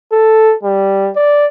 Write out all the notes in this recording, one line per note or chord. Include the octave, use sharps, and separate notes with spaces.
A4
G3
D5